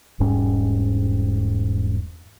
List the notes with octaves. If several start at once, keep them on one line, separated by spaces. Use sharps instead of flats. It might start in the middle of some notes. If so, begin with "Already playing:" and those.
E1 G#2 G3 C#4